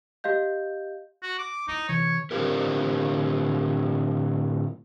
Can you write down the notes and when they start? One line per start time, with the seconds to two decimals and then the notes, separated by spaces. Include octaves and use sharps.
0.24 G4 D#5 F5 G6
1.22 F#4
1.39 D6
1.68 D#4 E4
1.89 C3 E3 C#5
2.31 A2 D3 C4 F4 G4 A#4